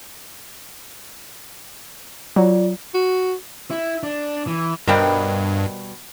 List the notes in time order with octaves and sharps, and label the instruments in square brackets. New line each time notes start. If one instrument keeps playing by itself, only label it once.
[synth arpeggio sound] F#3 [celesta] F4 D5
[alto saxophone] F#4
[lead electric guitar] E4
D4
E3
[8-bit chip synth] G2 [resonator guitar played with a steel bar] B2 G3 G5 [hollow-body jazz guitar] A#4 C5 D#5